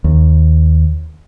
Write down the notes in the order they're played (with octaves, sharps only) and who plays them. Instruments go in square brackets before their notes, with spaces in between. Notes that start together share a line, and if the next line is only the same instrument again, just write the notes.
[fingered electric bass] D#2